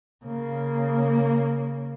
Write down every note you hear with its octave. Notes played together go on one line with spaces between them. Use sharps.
C#3 A#3